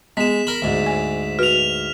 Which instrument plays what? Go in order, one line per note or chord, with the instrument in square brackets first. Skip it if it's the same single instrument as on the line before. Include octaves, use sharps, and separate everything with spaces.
[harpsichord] G#3 [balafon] B3 [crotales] B6 E7
[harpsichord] A#4 B5
D2 G#2
[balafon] G#5
[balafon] F#4 B4 [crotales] F6 F7